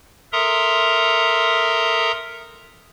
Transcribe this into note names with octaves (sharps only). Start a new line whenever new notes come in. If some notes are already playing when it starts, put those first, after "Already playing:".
A4 A#4 E5 A#5 C6 D#6